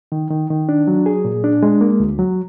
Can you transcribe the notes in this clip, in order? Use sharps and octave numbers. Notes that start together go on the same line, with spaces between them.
D#3
D#3
D#3
D4
F#3
G#4
A#2
D4
G#3
A#3
D2
F#3